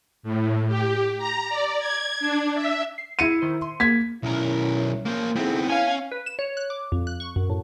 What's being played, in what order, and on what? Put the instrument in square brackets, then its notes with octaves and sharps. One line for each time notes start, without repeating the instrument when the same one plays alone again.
[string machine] A2
G4
A#5
D5
G#6
D4
E5
[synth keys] C7
[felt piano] E4 C#7 D#7
[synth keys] D#3 C5
C6
[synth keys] A#3 [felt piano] G#6 B6
[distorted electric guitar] B1 A#4 [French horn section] C#4 [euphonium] E4
[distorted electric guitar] A#3 C5 [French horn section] C#4
[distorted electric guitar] B3 C4 [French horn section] D#4 G#4 A4 [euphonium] E4
[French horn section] B3 [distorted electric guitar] C#4 [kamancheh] F5 G#5
[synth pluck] B4
E7
C#5
F#6
D6
F2
F#6
C#6
F#2
A2